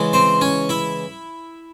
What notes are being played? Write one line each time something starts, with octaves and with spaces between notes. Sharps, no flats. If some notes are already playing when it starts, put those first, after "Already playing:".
Already playing: C#3 E3 G#3
C4 C5
C#4 C#5
E4 E5